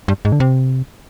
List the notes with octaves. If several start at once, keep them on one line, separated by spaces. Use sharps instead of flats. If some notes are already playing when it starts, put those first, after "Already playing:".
G2
G#2
D3
C3